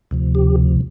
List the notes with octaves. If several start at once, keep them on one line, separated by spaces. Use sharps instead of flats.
D2 C3 F3
G4